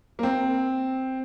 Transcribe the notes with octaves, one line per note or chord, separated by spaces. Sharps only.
A#3
C4